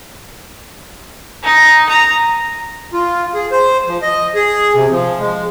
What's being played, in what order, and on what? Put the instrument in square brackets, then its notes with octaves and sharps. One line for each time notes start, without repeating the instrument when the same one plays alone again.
[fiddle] D#4
A#5 D#6
[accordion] F4
G#4
C5
F3
D#5
G#4
C3
F3
G#3